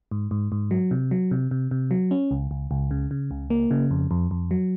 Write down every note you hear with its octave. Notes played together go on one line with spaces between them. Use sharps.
G#2
G#2
G#2
F#3
C3
F#3
C3
C3
C3
F#3
C#4
C#2
C#2
C#2
C#3
C#3
C#2
A#3
C#3
F2
F2
F2
F#3